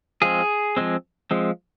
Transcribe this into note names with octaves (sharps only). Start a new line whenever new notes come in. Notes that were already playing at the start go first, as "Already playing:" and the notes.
F3 G#3 C4 G#4
F3 G#3 C4
F3 G#3 C4